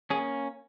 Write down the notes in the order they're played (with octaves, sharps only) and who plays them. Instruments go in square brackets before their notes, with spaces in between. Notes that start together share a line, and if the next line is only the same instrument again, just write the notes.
[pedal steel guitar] A#3 C#4 G#4